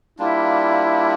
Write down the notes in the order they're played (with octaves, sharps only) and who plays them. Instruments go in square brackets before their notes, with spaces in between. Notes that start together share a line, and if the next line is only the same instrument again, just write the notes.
[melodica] G3 A#3 D4 F4 [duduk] E4